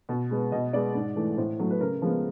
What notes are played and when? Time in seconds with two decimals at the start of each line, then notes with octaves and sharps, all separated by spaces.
0.09 B2
0.31 G#3 B3
0.52 B2 D#5
0.73 G#3 B3 D5
0.95 G#2
1.16 E3 A3
1.38 A2 C5
1.59 F#3 A3
1.71 B4
1.81 C#3 A#4
2.02 F3 G#3 B3